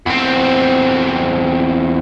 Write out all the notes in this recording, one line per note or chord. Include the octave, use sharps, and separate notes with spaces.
E2 C4